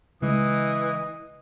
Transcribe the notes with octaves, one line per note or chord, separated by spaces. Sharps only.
C#3 E3 G#3 D#5 D#6